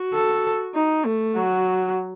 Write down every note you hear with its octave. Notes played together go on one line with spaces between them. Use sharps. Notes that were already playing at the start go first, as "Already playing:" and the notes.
Already playing: F#4
A4
D#4
A3
F#3 F#4